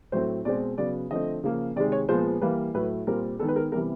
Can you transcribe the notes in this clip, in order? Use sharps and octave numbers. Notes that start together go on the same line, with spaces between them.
A2 F#3 A3 C4 C5
B2 G#3 C4 D5
C#3 F#3 B3 D5
D3 F3 A3 C4 D#5
C#3 F3 A#3
C3 D#3 G#3 D5
C#5
A#2 F3 G#3 B3 C5
E3 G3 A#3 B4
A2 F#3 A3 B4
A#2 G3 C4 A#4
D#3 G#3 B3 A4
B4
A#4
C3 E3 G3 B3 A#4